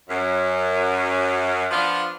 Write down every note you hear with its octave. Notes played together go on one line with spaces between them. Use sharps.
F#2
F3 B3 D4 F4